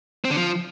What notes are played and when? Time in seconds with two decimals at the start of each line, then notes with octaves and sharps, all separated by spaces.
0.24 C4
0.30 D3
0.36 F3